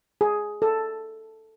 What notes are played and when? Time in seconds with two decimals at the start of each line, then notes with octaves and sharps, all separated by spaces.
0.21 G#4
0.62 A4